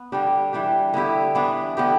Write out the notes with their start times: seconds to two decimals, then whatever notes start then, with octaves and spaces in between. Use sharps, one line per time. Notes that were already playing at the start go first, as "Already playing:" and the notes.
Already playing: B3
0.12 D3 G3 D4 G4
0.53 E3 G3 D4 G4
0.94 D3 B3 E4 G4
1.35 E3 B3 D4
1.77 D3 B3 G4